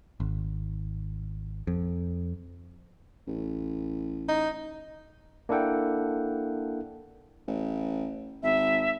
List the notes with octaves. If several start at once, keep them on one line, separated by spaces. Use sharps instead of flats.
G#1
F2
A1
D#4
A#3 D4 E4 A4 F#5 G5
A1
G#1 E5